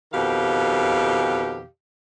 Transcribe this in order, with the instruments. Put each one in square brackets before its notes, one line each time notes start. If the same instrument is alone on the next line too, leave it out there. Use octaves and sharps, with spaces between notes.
[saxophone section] F2 B2 D#3 G4 F5